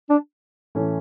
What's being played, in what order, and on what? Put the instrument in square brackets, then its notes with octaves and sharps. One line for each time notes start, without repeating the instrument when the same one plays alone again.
[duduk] D4
[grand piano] A2 E3 A3 C#4